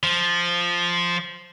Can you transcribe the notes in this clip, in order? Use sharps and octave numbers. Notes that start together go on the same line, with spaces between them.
F3